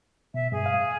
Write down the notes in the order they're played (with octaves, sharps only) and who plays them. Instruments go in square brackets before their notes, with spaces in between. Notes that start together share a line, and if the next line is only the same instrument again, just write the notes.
[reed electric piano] B2 [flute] E5
[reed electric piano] G2 [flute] G#4
[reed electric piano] A2 F5